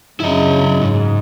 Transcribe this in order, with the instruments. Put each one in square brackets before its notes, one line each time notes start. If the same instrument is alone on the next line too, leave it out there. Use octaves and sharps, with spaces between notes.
[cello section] F#2 C#3 [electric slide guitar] E4 D#5
[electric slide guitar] G#2